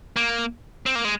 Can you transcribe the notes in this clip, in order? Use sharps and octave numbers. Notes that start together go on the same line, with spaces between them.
A#3
C4
A#3
G#3